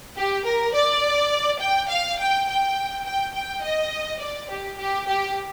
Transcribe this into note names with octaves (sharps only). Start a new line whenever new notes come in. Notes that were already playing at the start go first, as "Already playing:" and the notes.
G4
A#4
D5
G5
F5
G5
G5
G5
G5
D#5
D5
G4
G4
G4